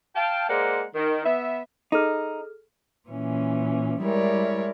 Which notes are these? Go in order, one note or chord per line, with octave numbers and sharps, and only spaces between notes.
F5 G5 A5
G#3 A#3 C5 D5 F#5 A#5
D#3
B3 E5
D#4 G#4 A4 F6
A#2 E3 C#4
G3 G#3 E4 A#4 C#5 D5